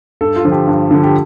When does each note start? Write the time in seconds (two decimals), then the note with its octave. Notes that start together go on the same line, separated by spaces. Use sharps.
0.21 G2 A4
0.36 F4
0.45 D3 F3
0.52 G4
0.67 G2
0.91 D3 F3
1.03 G4